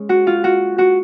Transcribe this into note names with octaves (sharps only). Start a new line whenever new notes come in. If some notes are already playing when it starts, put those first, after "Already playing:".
Already playing: G#3 C#4
F#4
F4
F#4
F#4